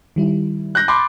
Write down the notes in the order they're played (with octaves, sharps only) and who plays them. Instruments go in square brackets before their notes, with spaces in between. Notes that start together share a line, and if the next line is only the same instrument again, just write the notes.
[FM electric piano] D#3 G3 E4
[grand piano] F#6 G6 A#6
[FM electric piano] A5 A6 [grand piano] B5 C6 D6